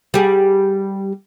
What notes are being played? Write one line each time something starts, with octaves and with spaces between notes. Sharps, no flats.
G3 G4 G#4